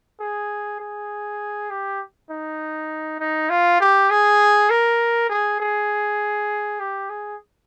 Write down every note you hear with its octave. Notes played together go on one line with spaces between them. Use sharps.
G#4
G#4
G4
D#4
D#4
F4
G4
G#4
A#4
G#4
G#4
G4
G#4